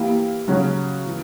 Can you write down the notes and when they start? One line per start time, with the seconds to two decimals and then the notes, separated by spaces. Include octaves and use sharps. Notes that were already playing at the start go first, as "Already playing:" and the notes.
Already playing: E3 A#3 E4 G4
0.48 C#3 F#3 C#4 F#4
1.06 E3